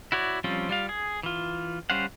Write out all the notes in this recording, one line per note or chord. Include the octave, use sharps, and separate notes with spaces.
E4 F#4 C#5 D5
F3 G3 C4 C#4 F4
G3 F4 F5
G#4
E3 F4
G3 C#4 C5 F5 F#5